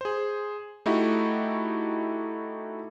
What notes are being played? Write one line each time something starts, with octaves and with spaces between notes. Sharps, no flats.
G#4 C5
A3 D#4 E4 F#4 G4